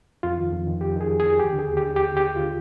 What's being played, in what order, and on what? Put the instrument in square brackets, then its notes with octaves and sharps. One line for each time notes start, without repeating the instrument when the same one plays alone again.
[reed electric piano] F2 F4
D#3
F2
D#3
F2 G4
D#3 G#4
F2
G#4
D#3
D#2 G4
D3
G#4
D#2
G4
D3
D#2 G4
D3
G4
D#2
D3 F4